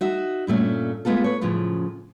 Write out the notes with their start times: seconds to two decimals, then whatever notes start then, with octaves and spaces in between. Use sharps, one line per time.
0.01 D#4 F#4 E5
0.47 G2 A#2 A3 C#4
1.05 G#3 A3 B3 F4 A4
1.24 B4 C#5
1.41 F#2 A2 C#3 F3